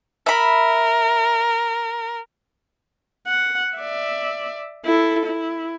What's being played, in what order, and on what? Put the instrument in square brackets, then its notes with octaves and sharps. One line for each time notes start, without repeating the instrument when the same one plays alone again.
[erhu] A#4 [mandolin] E5 B5
[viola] F#5
D5 E5
E4 A4
E4